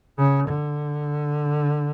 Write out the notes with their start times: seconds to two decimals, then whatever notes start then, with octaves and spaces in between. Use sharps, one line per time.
0.18 C#3
0.48 D3